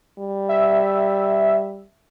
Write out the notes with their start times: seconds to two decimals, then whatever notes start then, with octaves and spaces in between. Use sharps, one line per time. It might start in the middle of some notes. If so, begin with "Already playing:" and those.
0.19 G3
0.49 E5